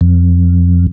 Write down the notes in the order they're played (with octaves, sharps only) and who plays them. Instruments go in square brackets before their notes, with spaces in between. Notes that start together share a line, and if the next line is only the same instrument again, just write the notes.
[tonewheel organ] F2